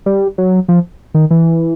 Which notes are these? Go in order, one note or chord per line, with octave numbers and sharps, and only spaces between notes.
G3
F#3
F3
D#3
E3